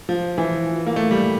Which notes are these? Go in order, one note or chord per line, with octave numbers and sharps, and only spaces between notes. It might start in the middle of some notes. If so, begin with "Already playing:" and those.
F3
E3
A#3
A3
G3